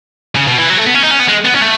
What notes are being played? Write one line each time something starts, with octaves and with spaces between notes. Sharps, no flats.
C#3
B2
E3
F#3
A3
B3
C#4
D#4
C#4
B3
G#3
B3
C#4
A3